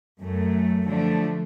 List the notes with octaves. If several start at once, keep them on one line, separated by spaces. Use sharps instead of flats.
F#2 A3
D3 F3 A3 D4